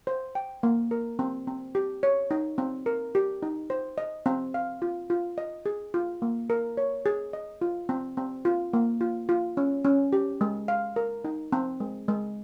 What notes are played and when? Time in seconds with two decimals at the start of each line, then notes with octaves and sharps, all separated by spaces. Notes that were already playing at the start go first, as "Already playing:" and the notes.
0.07 C5
0.35 G5
0.63 A#3
0.91 A#4
1.19 C4
1.47 C4
1.75 G4
2.03 C#5
2.31 D#4
2.58 C4
2.86 A#4
3.15 G4
3.42 D#4
3.70 C5
3.98 D#5
4.26 C4
4.54 F5
4.82 F4
5.10 F4
5.38 D#5
5.66 G#4
5.94 F4
6.22 A#3
6.50 A#4
6.77 C#5
7.06 G#4
7.33 D#5
7.61 F4
7.89 C4
8.17 C4
8.45 F4
8.73 A#3
9.01 F4
9.29 F4
9.57 C#4
9.84 C#4
10.13 G4
10.41 G#3
10.68 F5
10.96 A#4
11.24 D#4
11.52 C4
11.80 G#3
12.08 G#3